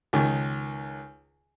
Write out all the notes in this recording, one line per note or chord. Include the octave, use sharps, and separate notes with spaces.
C#2 D#3